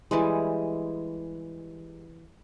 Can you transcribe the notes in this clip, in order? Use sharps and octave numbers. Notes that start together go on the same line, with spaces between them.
E3 G3 G#3